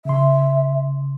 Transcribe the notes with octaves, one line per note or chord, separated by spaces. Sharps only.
C#3 E5 C6